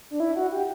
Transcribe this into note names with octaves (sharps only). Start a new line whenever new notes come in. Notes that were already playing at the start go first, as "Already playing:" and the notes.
D4
E4
F#4
G4